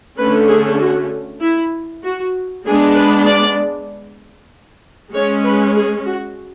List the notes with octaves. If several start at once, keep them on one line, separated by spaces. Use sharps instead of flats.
D3 A3 C#4 B4
G#4
F#4
E4
F#4
G#3 B3 D4 G#4
B4
D5
G#3 C#4 C#5
B4
G#4
F#4